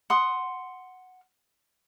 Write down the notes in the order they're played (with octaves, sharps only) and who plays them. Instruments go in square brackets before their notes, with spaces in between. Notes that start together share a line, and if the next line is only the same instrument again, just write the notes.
[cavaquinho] F#5 C6 D#6